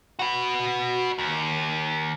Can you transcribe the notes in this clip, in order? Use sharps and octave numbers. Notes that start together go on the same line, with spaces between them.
F#4 B4
D#2